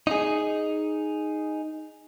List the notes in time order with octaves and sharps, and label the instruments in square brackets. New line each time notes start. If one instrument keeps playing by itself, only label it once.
[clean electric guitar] D#4 G#4